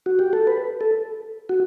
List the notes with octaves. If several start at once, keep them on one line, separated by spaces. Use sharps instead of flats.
F#4
G4
A4
B4
A4
F#4